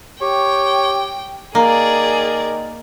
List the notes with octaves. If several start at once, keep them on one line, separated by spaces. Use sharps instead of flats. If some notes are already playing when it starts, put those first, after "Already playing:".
G4 C#5 G5
D#3 A#3 G#4 A#4 D5